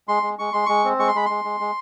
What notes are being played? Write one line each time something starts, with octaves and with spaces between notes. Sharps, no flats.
G#3 C6
G#3
G#3 C#6
G#3 C6
G#3 C#6
C4
G#3 C#6
C6
G#3 B5
G#3 C6
G#3
G#3